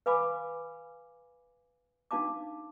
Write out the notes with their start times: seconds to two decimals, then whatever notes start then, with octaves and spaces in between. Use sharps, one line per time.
0.06 B4 F5 G#5 B5 D6
2.11 D4 D#4 F5 A5 D6